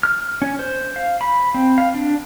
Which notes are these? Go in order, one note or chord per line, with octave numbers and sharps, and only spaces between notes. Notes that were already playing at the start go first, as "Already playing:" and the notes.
F6
C#4
C5
F5
B5
C4
F5
D4